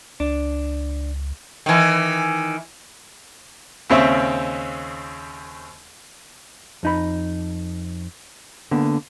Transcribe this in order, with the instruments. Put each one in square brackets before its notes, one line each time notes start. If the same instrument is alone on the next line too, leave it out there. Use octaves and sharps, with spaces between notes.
[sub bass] C#2 [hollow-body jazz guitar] D4
[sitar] D#3 E3
[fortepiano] D#2 C#3 C4 C#4 E5
[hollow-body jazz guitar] F2 D#4 B5
D3 A#3 B3